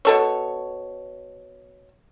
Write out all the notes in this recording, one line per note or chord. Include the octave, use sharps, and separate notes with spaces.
B2 A4 C#5